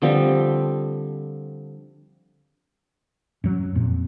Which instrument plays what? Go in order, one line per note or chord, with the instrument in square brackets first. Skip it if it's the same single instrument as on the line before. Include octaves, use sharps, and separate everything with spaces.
[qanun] D3 F3 G3 C4
[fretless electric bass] F#2 F#3
F2 A#2